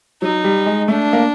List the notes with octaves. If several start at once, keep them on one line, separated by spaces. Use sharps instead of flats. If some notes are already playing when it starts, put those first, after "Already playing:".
F#3 D#4
G3
G#3
A3 D4
A#3